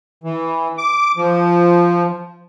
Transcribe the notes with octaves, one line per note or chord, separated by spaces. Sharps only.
E3
D6
F3